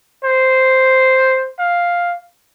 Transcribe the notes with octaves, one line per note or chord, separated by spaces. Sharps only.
C5
F5